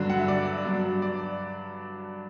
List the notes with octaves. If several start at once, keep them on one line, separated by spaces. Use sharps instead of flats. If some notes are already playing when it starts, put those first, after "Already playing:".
Already playing: G2 D3 F#3
F#5
E5
D5
G2 F#3
D5